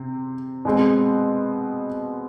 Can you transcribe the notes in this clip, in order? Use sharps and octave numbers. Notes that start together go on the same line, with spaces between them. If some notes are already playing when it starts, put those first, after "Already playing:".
Already playing: C3 C4
B2 G#3 C4